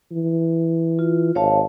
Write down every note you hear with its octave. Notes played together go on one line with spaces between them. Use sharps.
E3
F4
G#1 C#5 F5 A5